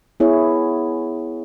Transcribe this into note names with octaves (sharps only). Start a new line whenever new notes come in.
B3 E4 G#4 C#5